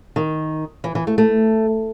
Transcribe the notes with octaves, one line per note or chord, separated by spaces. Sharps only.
D#3
E3
E3
A3
A3